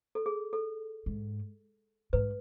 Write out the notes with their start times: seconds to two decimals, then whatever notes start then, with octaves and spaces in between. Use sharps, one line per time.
0.15 A4
0.26 G#4
0.53 A4
1.06 G#2
2.13 G#2 B4